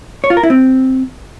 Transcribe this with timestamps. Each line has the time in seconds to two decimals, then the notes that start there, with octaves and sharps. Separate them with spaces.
0.24 C#5
0.30 F4
0.37 A#4
0.43 E4
0.50 C4